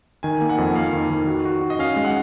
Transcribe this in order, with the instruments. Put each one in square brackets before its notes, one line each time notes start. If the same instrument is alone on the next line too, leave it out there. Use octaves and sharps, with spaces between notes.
[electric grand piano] D#3 [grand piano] G#5
[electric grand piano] A#3
[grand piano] F#5
[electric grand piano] F2
[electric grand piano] A#3 [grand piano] F5
[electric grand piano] D#3
D#3
F#4
F#4
F#4
[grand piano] D#5
[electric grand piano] C#4 [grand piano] F5
[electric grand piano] G#3
[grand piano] F#5